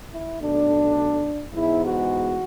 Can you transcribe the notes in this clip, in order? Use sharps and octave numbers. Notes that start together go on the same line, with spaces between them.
E4
B1 B2 A3 D4
G#2 E3 G#3 B3 E4
F#4